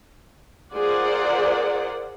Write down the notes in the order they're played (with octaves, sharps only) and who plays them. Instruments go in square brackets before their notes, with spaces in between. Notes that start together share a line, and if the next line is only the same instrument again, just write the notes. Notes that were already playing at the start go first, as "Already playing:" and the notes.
[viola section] F4 G#4 A#4 C5 D5 F#5